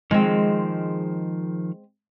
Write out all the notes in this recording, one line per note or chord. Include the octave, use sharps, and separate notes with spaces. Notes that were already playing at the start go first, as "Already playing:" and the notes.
D#3 F3 G#3 C4